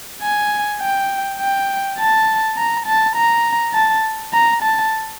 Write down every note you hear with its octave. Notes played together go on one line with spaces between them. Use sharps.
G#5
G5
G5
A5
A#5
A5
A#5
A5
A#5
A5